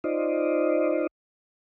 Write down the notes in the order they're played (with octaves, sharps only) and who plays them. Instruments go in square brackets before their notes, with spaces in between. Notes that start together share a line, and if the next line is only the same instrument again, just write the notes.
[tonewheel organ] D#4 F4 C5 D5 D#5